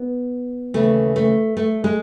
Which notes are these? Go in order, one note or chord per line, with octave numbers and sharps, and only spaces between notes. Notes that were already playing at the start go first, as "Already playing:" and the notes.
Already playing: B3
D#2 C#3 E3 A3
A3
A3
G#3